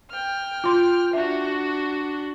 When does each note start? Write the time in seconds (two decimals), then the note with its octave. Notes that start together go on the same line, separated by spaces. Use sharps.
0.10 G5 F6
0.64 F4 C6
1.13 D4 F#4 E5